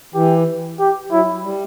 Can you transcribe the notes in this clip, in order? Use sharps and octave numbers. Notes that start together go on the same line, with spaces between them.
E3 G4
G4
F#3 E4
G3